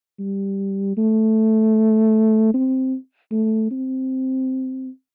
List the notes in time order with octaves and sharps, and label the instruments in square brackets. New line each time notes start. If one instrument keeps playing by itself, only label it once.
[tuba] G3
A3
C4
A3
C4